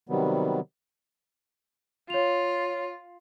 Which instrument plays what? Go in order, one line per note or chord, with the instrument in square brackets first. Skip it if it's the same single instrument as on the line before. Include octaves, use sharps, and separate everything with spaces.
[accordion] C3 D#3 F#3 G3 B3
[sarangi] F4 [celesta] C#5 F7